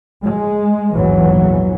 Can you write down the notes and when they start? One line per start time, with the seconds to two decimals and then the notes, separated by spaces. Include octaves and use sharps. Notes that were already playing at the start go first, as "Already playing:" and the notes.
0.23 G#3
0.93 A#1 E2 G#2 E3 F#3